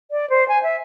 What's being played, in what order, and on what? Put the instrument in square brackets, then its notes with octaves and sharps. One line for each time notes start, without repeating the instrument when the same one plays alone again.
[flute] D5
C5
G#5
E5